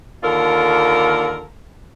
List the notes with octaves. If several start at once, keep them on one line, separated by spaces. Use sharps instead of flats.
D#2 D3 F4 A4 A#4